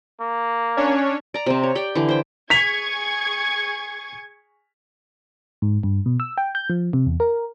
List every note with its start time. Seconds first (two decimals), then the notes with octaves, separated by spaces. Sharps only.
0.21 A#3
0.77 C#4 D4 C#5
1.34 D5 A#5
1.46 C3 C4
1.63 C#5
1.75 G4 D5 G5
1.95 D3 E3
2.09 C5 G5
2.50 G#4 C#6 G#6 B6 F7
5.62 G#2
5.83 G2
6.06 B2
6.20 E6
6.38 G5
6.55 G6
6.70 F3
6.93 C3
7.06 E2
7.20 A#4